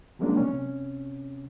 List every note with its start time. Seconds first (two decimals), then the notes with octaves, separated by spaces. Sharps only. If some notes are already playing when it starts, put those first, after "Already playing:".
0.19 F3 F#3 G#3 A#3 C#4 D4
0.37 C3 C#4